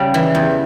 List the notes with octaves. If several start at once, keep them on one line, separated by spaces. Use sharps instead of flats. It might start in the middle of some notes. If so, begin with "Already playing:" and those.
Already playing: C#3 G3
E3
E2